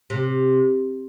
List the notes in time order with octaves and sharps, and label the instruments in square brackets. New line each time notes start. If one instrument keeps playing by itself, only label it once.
[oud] C3